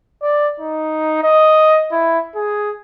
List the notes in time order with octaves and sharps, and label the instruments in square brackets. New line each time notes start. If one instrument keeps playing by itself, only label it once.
[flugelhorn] D5
D#4
D#5
E4
G#4